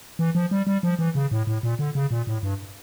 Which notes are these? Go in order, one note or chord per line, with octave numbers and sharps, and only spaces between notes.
E3
F3
G3
G3
F3
E3
C#3
A2
A2
A#2
D3
C#3
A#2
A2
G2